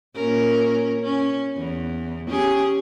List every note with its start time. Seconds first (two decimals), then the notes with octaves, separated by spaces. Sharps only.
0.15 A#2 C#4 A#4
1.02 C#4
1.57 E2
2.27 C#4 G4 G#4